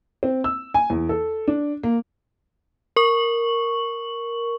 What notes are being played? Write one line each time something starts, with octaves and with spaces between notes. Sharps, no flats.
C4
E6
G#5
E2
A4
D4
A#3
A#4 C#6 F#7